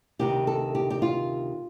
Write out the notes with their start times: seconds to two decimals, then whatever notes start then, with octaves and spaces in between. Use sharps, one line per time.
0.19 D2 C3 D#3 G4
0.47 A4
0.75 G4
0.90 G4
1.02 F4